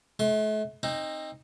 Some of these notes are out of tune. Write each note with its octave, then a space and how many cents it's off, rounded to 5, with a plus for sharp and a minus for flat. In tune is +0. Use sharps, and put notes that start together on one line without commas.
A3 -40 C6 +25
C4 +25 D#4 +0